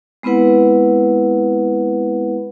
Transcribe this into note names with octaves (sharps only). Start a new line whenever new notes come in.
G#3 B3 C4 E4 B4 F#5